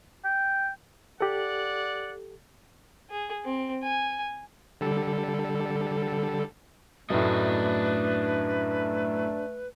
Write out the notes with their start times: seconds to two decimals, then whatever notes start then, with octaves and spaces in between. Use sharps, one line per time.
0.25 G5
1.21 G4 A4 D5 F#5
3.10 G#4
3.44 C4
3.83 G#5
4.81 D3 G3 A4
7.10 F#2 A2 A3 D4 B4 D#5